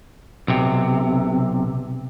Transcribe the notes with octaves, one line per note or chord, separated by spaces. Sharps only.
B1 C3